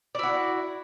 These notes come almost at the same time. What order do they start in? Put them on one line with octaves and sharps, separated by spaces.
D5 E4 F#4